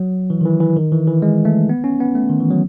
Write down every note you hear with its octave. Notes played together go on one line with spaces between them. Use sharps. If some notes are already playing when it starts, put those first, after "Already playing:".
Already playing: F#3
E3
D#3
E3
E3
D#3
E3
E3
G#3
A3
B3
C#4
B3
A3
D#3
E3
F#3